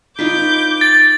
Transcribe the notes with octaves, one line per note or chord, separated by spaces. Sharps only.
D#4 F4 B4 D6 G6
A6